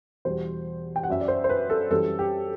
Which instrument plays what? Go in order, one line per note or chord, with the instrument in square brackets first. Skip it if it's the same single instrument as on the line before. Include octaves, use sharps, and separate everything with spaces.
[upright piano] E2 B2 G3 C5
G5
F#5
F#2 F#3 E5
D5
C5
C5
B4
A4
F#2 E3 G3 A4
G4